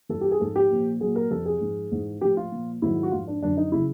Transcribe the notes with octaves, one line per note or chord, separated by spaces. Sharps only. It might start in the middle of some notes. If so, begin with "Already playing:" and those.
G2 E3 A4
G4
G#4
G#2 F3 A4
G4
A#2 F3
A#2 F#3 G#4
A#4
F2 C3 F3 A4
G#4
G#2 F3
G#2 E3
A2 F3 G4
F4
A#2 F3
G#2 D#3 F#3 E4
F#4
G#2 F3 F4
D4
F#2 D3 F3 D4
D#4
C#3 F#3 E4